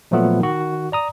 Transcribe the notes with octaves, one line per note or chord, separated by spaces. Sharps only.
A#2 F3 F#3 A3 B3 F4
D#3 F#4
D5 A#5 D#6